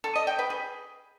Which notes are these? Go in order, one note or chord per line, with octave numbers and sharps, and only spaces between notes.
A4
D#5
G5
B4
G#4